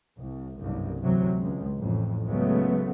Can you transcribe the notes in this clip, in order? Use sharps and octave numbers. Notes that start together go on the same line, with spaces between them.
C2
F#1 C2 G2
D2 C3 E3 F#3
C#2 G#3
A1 F2 A2
C#2 C#3 F#3 G#3 A3 B3